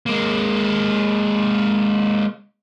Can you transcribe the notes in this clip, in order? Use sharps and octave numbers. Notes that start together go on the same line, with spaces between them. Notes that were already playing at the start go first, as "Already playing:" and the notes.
G#3 A#3